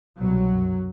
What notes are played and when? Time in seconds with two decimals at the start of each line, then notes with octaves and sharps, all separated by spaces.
0.19 C2 B2 F#3
0.51 F#2